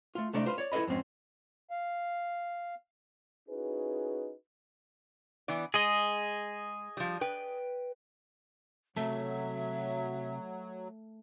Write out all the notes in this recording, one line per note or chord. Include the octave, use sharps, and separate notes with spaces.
A3 F4
C2 C3 A3 D4 D5 D#5
F4 B4 C5
C#5 D5
E4 A4 B4 D#5 B5
F2 G#2 C4 C#4
F5
C#4 D#4 E4 F#4 G#4 B4
E3 B3 D5
G#3 G#4 D#5
F3 G3
B4 G5
C3 F#3 A3 E5